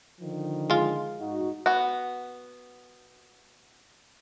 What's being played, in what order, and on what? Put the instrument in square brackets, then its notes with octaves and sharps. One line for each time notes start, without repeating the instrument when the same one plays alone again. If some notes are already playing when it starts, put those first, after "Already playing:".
[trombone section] D3 D#3 F3
[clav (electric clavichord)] G#3 F4
[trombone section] G#2 D#4 F#4
[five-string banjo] B3 F#4